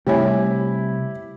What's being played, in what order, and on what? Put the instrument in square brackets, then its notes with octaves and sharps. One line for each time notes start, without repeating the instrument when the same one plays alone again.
[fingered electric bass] C3 G3 [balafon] A3 C#5 G#5 [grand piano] E4 G4